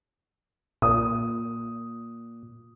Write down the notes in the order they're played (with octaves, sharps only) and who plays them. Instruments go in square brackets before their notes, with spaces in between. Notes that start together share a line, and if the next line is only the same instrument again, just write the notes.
[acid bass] A#2 [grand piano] D#6